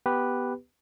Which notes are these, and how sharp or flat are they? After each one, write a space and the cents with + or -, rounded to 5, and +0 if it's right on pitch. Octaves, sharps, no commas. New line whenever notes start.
B3 +0 G4 +0 B4 +0